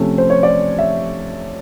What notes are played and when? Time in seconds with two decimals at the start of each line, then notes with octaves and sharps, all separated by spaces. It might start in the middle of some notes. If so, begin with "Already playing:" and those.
Already playing: C3 F3 A3 C#4
0.18 C5
0.30 C#5
0.43 D5
0.78 E5